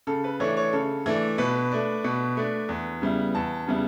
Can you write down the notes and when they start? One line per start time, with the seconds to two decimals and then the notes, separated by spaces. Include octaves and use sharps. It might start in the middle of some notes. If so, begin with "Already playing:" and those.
0.07 C#3 A4
0.24 B4
0.40 E3 A3 D4 C#5
0.57 C#5
0.73 C#3 A4
1.06 E3 A3 D4
1.38 B2 B4
1.72 A3 D4
2.04 B2
2.37 A3 D4
2.69 E2
3.02 C#3 G3 B3 E4
3.35 E2 A5
3.68 C#3 G3 B3 E4